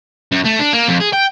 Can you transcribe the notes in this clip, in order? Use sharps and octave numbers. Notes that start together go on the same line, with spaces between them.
F#2
A3
D4
A#3
F2
G#4
G5